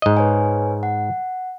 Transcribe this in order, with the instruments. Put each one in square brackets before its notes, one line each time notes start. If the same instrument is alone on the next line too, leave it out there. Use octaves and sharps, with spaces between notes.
[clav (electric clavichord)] G#2 D#5
[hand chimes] B4 C#5 G#5
F#5